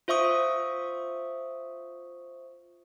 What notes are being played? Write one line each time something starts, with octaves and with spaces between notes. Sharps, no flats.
F4 C5 E5 C#6 D#6